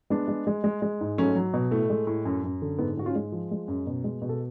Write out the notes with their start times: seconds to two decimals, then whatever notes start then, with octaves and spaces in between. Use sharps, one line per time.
0.10 G#3 B3 D4
0.28 G#3
0.47 G#3
0.64 G#3
0.82 G#3
1.01 G#2
1.18 F#3 A3 C#4
1.36 F#3
1.54 B2
1.71 A2 A3
1.90 G#3
2.07 A2
2.25 F#2
2.44 F#2
2.62 D3
2.79 G#2 B3
2.97 G#2 F#4
3.06 C#4 F4
3.15 G#3
3.32 F3
3.51 G#3
3.68 F#2
3.87 B2
4.04 G#3
4.22 B2
4.29 A4